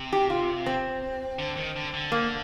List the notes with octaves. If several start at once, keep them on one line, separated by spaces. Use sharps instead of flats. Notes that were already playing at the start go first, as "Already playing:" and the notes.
Already playing: C3
G4
F4
C4
D3
D#3
D3
D3
A#3